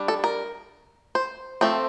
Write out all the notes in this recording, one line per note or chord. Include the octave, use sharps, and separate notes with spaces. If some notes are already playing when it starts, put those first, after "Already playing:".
Already playing: G3 D4
A4
A#4
C5
F3 A3 C4